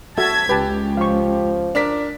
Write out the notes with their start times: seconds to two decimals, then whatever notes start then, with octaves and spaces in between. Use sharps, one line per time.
0.18 F#4 A4 E5 A5 G#6 B6
0.49 C#2 G4 B4 A5
0.97 F3 F5 C#6
1.75 D4 A#4 B6